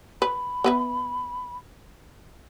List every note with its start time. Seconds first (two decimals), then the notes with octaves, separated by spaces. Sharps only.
0.22 B4 B5
0.64 B3 B4 E5